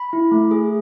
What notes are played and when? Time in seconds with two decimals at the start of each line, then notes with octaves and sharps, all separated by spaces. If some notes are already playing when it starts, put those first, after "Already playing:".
Already playing: B5
0.13 E4
0.32 A3
0.51 G#4